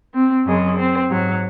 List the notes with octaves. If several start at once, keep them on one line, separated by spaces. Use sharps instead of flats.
C4
F#2 C#3 G#3
C4
G#2 F#3